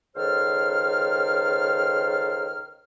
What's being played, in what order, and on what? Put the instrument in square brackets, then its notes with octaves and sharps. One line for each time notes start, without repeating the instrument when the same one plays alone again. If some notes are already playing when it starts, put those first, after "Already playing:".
[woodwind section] C#2 D#3 A4 C5 F6